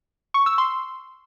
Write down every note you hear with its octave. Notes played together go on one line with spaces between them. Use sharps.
C#6
E6
C6